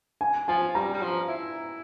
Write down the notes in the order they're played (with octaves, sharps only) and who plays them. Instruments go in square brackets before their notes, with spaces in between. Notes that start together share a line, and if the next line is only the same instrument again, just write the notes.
[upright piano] G#5
[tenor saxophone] F3 [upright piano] G#5
[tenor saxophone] G3 [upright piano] A#5
[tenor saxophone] G3
F3
E4